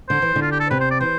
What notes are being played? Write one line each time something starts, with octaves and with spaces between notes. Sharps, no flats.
D3 C5
E3
D3
F4
G4
A4
C3 B4
C5
D5
E3 C5